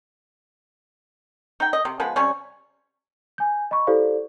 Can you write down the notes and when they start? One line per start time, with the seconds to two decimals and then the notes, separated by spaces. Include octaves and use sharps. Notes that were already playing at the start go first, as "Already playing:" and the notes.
1.60 D#4 G5
1.73 D#5
1.85 C3
2.00 F3 G#3 B3 B4
2.16 C3 G3 C#4 C#5
3.38 G#5 G6
3.71 D#5 B5 C#6
3.87 E4 G4 A4 C5 D5 F5